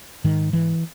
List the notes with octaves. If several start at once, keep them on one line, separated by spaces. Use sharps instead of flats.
G#2 D#3
E3